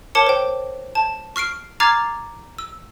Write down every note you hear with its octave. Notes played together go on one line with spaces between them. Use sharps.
A#4 C#5 A5 D6 C#7
C5 G5
A5
C#6 F6 C7 D7
A#5 D6 F6 G#6 A6 C7
E6